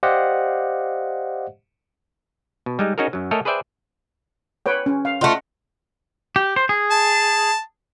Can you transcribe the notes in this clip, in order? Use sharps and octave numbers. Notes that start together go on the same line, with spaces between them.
G4 C5 D5 D#5 F5 F#5
B2
G3 G#3 D#4
C#4 D#4 F#4 G#4 A#4
F#2 F#3
A3 A4 A#4 C#5 D#5 G#5
G#4 B4 C5 D5 E5 G5
B4 C#5 G5
C#4
F5
A3 F4 D#5 F#5
G4
C5
G#4
A5